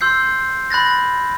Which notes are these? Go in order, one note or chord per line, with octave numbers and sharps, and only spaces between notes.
C6 E6 G6 C7
B5 F#6 A6 A#6